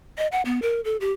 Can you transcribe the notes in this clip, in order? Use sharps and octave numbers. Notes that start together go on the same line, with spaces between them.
D#5
F#5
B3
A#4
A4
G4